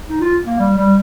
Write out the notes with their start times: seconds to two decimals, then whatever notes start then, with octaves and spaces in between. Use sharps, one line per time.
0.08 D#4
0.21 F4
0.46 A#3
0.59 G3
0.77 G3